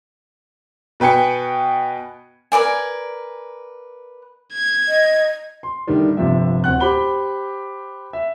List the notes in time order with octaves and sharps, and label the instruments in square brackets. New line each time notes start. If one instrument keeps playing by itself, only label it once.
[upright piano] B2 B4 G5 G#5 C#7
[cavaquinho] A#4 B4 D5 G#5
[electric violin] G#6
[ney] D#5
[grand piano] C6
A2 D3 D#3 G3
G1 C3 F3 E5
D1 C4 F#5 F#6
G4 C5 B5 G7
E5